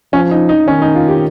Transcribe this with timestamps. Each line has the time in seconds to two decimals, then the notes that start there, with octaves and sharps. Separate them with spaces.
0.13 F3 C#4
0.31 D#4
0.49 D#4
0.68 D#3 C#4
0.82 D#4
0.95 F4
1.08 G4